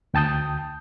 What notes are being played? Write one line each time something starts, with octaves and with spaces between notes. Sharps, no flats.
D2 G5 A5 D#6 G6